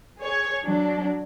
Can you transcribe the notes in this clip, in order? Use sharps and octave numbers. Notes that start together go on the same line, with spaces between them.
G#4 C#5
F#3 D4